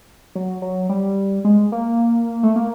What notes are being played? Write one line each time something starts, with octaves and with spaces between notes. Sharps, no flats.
F#3
F#3
G3
G#3
A#3
A3
A#3